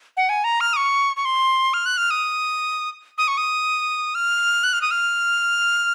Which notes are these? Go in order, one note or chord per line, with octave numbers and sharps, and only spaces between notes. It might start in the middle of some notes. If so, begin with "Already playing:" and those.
F#5
G#5
A#5
F6
D#6
C#6
C#6
C6
F6
F#6
F6
D#6
D#6
C#6
D#6
F6
F#6
F6
D#6
F6